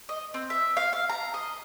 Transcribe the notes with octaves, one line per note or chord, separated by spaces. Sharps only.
D#5
C4
E5
F5
F5
A#5
D#5